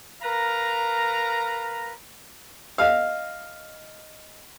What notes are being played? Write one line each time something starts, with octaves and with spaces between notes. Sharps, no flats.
A#4 B4 F5 A#5
D#5 F5